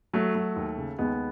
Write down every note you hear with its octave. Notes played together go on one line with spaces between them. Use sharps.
F#3 A3
F#3
D#2
C#3
D#2 G#3 B3